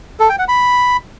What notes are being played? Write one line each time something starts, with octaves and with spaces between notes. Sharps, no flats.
A4
G5
F#5
B5